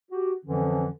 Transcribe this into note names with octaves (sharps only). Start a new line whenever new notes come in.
F#4 G4
F2 D3 E3 F3 C#4